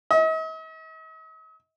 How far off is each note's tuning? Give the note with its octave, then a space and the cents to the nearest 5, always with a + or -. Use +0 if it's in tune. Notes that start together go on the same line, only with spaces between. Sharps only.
D#5 +45